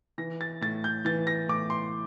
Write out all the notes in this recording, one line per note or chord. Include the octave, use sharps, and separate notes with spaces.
E3 A#6
A6
A2 A6
G6
E3 A6
A#6
A2 D6
C6